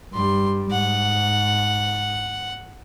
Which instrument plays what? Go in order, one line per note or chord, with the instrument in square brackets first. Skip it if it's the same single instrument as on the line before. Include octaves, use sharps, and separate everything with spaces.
[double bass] G2 G3 [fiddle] C6
[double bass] G#2 [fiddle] F#5